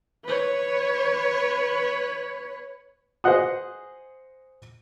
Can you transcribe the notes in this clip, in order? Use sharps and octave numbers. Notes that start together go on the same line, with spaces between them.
B4 C#5
G#4 C5 D#5 F#5 D#6